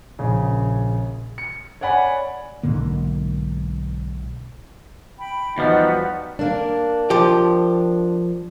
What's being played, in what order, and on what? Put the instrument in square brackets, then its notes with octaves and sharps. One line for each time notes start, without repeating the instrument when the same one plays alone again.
[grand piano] A#1 C#3
C#7
C#5 D5 F#5 G#5 B5
[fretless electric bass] B1 G#2 D3 A#3
[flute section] G5 B5
[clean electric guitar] E2 F3 G3 [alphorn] D#4 [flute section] F#4 B4 F#5
[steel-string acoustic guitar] A#3 D4
[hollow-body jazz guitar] F3 G4